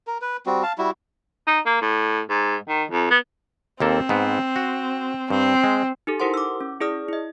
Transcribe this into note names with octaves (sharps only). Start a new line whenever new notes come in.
A#4
B4
G3 C4 F#4
F5 A5
G3 E4 F#4
D#4
A#3
A2
G#2
D#3
F2
B3
D#2 A#3 C4 A4
G#2 B3
F#4
G2 C4
G#3
D#4 G4 A4
E4 G4 A#4 C5 F#5 C6
D6 E6
C#4
E4 G#4 D5 D#6 F6
E4 D#5